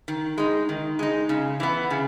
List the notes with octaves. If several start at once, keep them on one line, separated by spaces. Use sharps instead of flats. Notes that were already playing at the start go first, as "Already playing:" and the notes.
D#3
G#3 D#4
D#3
G#3 D#4
C#3
E3 B3
C#3